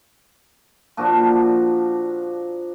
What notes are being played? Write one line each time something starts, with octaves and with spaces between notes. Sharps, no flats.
A#2 F3 D4 F#4